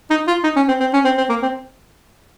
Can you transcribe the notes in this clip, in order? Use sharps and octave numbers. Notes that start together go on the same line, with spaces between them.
D#4
F4
D#4
C#4
C4
C4
C#4
C4
C4
A#3
C4